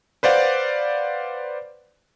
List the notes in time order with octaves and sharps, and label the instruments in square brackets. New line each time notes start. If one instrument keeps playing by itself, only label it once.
[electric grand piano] B4 C5 D5 F5 F#5